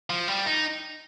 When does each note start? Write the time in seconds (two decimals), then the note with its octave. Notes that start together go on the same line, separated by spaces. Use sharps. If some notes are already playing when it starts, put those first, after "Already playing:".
0.10 F3
0.28 G3
0.46 D#4